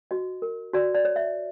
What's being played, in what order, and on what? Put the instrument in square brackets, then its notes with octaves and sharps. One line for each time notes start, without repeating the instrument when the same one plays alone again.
[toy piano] F#4 D#5
A#4
F#4 D5
D5
C#5
E5